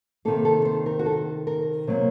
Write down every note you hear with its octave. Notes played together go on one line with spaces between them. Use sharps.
C3 D#3 A#3 A4
A4
C5
A#4
F#4
A4
A#4
C3 F#3 A#3